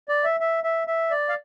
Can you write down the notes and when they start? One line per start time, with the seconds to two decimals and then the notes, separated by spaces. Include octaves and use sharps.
0.09 D5
0.24 E5
0.40 E5
0.64 E5
0.87 E5
1.10 D5
1.29 F5